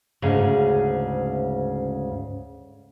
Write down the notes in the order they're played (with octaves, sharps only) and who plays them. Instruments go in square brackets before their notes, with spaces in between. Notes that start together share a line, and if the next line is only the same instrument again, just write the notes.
[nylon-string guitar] D2 G#2 C#3